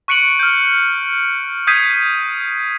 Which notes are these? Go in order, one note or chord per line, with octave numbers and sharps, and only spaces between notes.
C#6 F#6 C#7 D7 F#7
F6 G6
D#6 G6 G#6 B6 C7 D#7